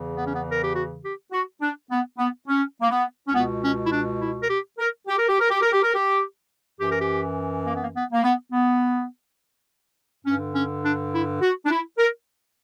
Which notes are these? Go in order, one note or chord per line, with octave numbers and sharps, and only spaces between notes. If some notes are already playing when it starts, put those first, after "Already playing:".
Already playing: E2 C#3 E3
B3
C#4
B3
A#4
G4
F#4
G4
F#4
D4
B3
B3
C#4
A#3
B3
C#4
C#2 B2 B3
C#4
E4
D4
E4
A#4
G4
A#4
G4
A#4
G4
A#4
G4
A#4
G4
A#4
G4
F#2 E3 G4
A#4
G4
A#3
B3
A#3
B3
A#3
B3
B3
G2 D3 C#4
C#4
D4
E4
F#4
D4
E4
A#4